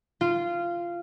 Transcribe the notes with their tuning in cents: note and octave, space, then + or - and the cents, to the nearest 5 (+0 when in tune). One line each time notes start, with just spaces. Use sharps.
F4 -15